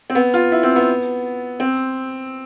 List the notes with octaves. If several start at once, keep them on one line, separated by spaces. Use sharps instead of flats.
C4
B3
F4
E4
C4
B3
C4